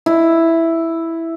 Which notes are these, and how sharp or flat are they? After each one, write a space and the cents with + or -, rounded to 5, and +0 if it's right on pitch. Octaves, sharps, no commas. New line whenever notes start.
E4 +0